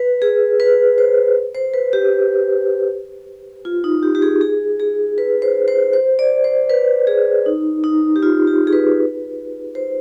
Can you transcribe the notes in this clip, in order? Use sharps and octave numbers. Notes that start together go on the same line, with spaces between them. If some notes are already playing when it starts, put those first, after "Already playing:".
Already playing: B4
G#4
B4
C5
C5
B4
G4
F4
D#4
G4
G4
G#4
G#4
G#4
B4
C5
C5
C5
D5
C5
B4
G#4
D#4
D#4
G4
F4
G4
G#4
B4
C5